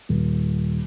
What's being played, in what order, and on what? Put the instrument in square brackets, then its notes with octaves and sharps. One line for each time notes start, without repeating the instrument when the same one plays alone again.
[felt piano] D#1